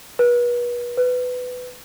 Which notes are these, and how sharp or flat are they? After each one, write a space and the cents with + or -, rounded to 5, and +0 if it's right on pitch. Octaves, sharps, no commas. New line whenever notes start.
B4 -35
B4 +15